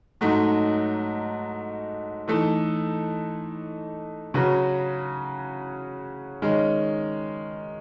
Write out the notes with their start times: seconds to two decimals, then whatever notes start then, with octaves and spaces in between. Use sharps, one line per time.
0.21 G#2 F#3 A3 D#4
2.28 E3 A3 D#4 A4
4.34 C#3 F#3 C#4 F#4 B4
6.42 D#3 G#3 C#4